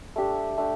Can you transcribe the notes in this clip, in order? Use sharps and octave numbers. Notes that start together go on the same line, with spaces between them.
A3 D4 G4
A3 D4 G4